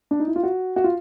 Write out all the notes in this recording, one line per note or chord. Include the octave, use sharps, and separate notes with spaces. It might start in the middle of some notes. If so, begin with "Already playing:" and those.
D4
D#4
E4
F4
F#4
F#4
F4